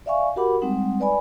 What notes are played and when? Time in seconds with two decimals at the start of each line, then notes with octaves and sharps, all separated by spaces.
0.06 D5 E5 F5 G#5 C#6
0.36 F#4 G4 A#4 F#5 B5 D6
0.61 G3 G#3 C4 D#4 F#5
1.00 B4 D5 G#5 B5